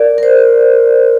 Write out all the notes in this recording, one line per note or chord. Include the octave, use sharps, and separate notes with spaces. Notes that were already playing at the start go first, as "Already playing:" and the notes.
Already playing: A#4 D5
A#4
C5